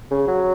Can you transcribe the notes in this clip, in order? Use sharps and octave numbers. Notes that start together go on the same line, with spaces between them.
C#3
F#3